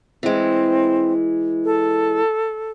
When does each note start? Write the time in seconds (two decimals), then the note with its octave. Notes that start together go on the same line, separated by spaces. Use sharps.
0.23 E3 G#3 C4
1.65 A4